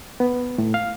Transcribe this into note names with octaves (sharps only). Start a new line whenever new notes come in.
B3
A2
F5